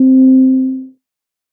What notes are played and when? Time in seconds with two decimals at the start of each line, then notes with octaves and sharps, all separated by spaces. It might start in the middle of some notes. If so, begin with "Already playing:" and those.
Already playing: C4